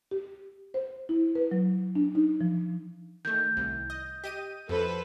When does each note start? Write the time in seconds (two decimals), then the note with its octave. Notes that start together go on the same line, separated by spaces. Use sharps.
0.11 G4
0.74 C5
1.09 E4
1.35 B4
1.51 F#3
1.96 D4
2.15 D#4
2.41 F3
3.25 D#3 A3 G6
3.57 C2
3.90 D#5
4.24 G4 D#5 D#7
4.69 F2 A4 B4 C5